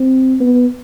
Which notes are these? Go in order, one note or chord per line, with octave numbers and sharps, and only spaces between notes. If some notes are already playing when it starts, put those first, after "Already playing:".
Already playing: C4
B3